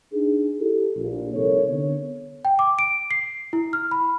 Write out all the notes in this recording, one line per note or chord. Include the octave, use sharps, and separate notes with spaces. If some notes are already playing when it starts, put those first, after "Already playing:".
D4 D#4 G#4
E4 G4 A4
A#1
C2 C3 D#4 A4 A#4 C#5
D3 B3 C#5
G5
D6
D7
C7
E4
F6
B5